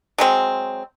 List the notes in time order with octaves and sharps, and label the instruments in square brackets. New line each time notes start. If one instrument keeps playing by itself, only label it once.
[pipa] F#3 G#3 C4